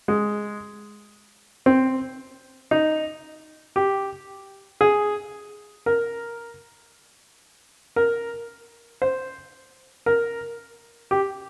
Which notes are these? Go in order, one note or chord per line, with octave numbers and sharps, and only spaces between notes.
G#3
C4
D#4
G4
G#4
A#4
A#4
C5
A#4
G4